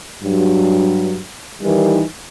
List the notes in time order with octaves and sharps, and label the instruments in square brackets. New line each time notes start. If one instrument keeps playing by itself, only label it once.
[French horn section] G2 F#3
D#3 E3 G3